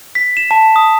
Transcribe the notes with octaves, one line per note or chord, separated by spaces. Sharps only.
B6
E7
A5
D#6